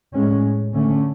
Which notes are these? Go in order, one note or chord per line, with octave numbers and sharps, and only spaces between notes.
A2 G#3 C#4
D3 A3 C#4